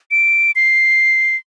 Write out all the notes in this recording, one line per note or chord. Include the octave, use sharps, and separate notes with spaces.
D7
C7